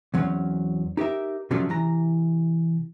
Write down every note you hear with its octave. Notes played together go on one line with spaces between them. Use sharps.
E2 F#3 C4 C#4
D#4 G4 A#4 E5
C3 F3 F#3 A3 C#4 D4
C3 E3 A#5